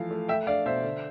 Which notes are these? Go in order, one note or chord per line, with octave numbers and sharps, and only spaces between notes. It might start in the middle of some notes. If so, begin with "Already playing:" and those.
Already playing: E3 F3 A3 F5
A3
A3 E5 G5
D4 D5 F5
B2 C5 E5
D3